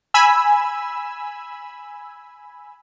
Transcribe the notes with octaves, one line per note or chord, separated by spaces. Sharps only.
G#5 B5 E6